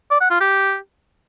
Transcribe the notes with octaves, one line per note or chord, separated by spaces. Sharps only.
D5
F#5
F4
G4